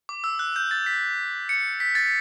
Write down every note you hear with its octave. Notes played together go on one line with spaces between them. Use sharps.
D6
E6
F#6
G6
A6
B6
C#7
B6
A6